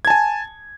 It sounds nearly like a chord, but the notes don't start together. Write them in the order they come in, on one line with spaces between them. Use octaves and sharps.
G#6 A5 G#5